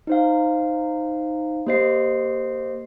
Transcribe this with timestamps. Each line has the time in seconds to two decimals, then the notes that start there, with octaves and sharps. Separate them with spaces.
0.07 D#4 C5 F5
1.67 A#3 G4 C5 D#5 C7